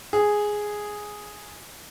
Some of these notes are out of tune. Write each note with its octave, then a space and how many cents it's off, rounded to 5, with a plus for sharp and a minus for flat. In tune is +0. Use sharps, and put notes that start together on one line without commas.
G#4 +0